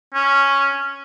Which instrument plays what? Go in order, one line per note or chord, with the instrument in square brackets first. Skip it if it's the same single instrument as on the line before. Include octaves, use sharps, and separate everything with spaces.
[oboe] C#4